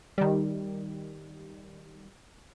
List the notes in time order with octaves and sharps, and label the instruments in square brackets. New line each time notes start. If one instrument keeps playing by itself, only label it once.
[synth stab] D#3 G3